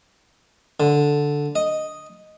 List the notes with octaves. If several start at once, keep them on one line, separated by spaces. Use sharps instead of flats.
D3
D#5